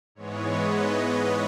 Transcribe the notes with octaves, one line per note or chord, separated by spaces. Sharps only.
G#2 E3 G#3 B3 C#5
B4 D#5